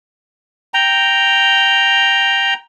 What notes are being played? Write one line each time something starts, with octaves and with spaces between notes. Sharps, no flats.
G5 A#5